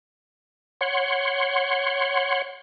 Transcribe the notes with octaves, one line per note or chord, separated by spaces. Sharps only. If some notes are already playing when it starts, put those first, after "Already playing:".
C#5 F#5 C6